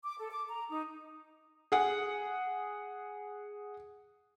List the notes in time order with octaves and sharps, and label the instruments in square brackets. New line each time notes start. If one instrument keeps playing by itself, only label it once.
[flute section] D6
A4
D6
A#5
D#4
[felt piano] G#4 F#5